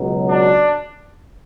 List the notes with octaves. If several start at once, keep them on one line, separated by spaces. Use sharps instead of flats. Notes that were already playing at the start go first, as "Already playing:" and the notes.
Already playing: C#2 B2 F#3
D4